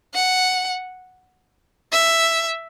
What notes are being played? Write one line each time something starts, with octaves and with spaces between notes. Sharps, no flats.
F#5
E5